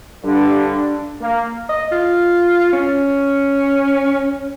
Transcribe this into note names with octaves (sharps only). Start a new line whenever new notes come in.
G2 D3 D4
A#3
D#5
F4
C#4